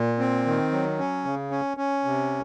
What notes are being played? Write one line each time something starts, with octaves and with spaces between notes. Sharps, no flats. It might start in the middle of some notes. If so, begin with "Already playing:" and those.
Already playing: A#2
C4
D#3
F#3
C#4
C#3
C#4
C#4
C3